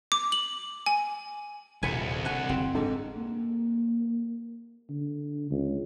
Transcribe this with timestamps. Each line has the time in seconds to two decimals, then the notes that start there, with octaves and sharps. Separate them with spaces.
0.12 D6
0.32 F#7
0.86 G#5
1.83 D#1 C2 G#5 G#6 B6 C#7
2.25 D3 F#5 G#5
2.49 F#1 C4
2.75 G#2 D4 A4
3.16 A#3
4.89 D3
5.50 C#2